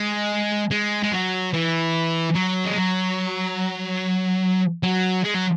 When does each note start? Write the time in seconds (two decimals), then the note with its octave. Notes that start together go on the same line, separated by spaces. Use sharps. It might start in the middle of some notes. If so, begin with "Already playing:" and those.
Already playing: G#3
0.71 G#3
1.03 G#3
1.12 F#3
1.54 E3
2.35 F#3
2.65 G#3
2.77 F#3
4.83 F#3
5.24 G#3
5.35 F#3